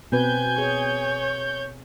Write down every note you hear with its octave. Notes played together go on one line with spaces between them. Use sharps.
B2 C4 B4 G#5 G6
G#4 C#5